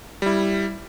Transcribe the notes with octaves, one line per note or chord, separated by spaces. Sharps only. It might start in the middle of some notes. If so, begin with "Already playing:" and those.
G3 E4